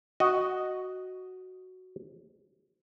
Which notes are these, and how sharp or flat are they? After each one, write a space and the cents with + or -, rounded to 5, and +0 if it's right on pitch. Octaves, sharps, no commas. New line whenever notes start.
F#4 +5 D#5 +0